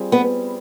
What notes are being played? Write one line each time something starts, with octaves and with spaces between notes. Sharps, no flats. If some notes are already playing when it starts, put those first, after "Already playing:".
Already playing: G3 C4 F4 G#4
B3